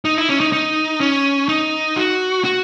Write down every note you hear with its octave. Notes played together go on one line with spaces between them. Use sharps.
D#4
E4
C#4
D#4
D#4
C#4
D#4
F#4
F#4